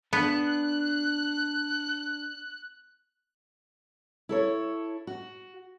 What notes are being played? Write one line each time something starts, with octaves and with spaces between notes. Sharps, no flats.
B3 D4 F#6
E4 A4 C#5
F#4